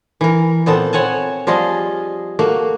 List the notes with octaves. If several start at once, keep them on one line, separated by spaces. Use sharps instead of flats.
E3 A#4
A#2 B3 C4 A4
C4 C#5 F#5 G#5 A5
F3 G3 F4 G#4 D#5
A3 A#3 F#4